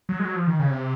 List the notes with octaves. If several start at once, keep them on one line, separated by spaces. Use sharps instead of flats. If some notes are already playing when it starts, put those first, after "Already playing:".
F#3
G#3
F#3
F3
D#3
C#3
C3